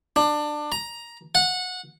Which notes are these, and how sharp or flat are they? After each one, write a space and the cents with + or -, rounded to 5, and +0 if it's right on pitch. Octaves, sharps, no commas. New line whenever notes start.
D4 +20
A#5 +10
F#5 -20